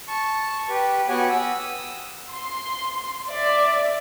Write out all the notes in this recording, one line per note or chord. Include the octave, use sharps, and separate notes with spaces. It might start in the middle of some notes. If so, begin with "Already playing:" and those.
A5 C#6
G4 B4
B3 F#4 G4 C#5 F#5 G#5
D#6 E6
C6
D5 E5